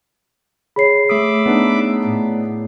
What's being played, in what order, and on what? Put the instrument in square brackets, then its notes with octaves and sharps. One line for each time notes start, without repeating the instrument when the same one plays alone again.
[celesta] G#4 C#5 C7 [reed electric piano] B5
[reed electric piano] A3 D#6 [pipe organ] E5 B5 D6
[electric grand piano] B3 D4 D#4
[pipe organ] A2